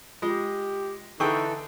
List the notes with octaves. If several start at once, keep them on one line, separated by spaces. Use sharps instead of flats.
G#3 F4 G4 D#5
D3 E3 D#4 G#4 A4 G5 C#6